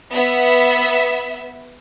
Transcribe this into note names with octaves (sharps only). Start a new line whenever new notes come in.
B3 E5